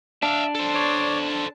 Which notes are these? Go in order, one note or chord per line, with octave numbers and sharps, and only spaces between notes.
D4 E5 F5
A4 C5
C#5 D5
A5